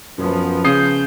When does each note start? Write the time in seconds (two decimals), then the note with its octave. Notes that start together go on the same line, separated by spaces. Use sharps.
0.18 F#2 F3 B3
0.65 C#3 D#6 G6 C7